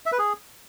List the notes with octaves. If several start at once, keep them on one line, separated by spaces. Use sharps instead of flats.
E5
B4
G#4